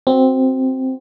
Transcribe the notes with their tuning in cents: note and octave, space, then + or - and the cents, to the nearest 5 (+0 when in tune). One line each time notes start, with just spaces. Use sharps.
C4 +0 F#4 +0